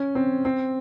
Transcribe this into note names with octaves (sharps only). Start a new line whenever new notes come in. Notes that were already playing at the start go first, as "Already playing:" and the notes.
Already playing: C#4
C4
C4